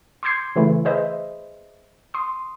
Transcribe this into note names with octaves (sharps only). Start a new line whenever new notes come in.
C6 D6 E6 G6 G#6 C7
C#3 E3 A3 E4
G#4 B4 C5 D#5 E5
C6 D#6